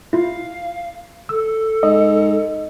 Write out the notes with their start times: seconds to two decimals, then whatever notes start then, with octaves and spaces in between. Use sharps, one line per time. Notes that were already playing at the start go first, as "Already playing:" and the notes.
0.13 E4 F4 F5
1.29 A4 E6
1.83 G#2 D#5